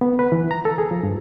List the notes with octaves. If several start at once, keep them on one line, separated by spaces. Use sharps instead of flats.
B3
B4
E3
A#5
A4
G#4
F3
G2